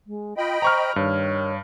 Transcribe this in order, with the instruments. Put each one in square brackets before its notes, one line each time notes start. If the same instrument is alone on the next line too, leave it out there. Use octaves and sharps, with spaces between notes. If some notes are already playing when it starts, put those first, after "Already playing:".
[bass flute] G#3
[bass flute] F4 [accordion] D#5 G5 B5
[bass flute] C5 [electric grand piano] A#5 C#6 F6
[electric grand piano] G2 [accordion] D#3 [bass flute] C#5